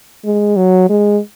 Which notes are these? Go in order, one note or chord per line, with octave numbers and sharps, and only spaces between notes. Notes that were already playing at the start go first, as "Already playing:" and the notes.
G#3
F#3
G#3